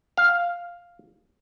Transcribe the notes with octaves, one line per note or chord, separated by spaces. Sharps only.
F5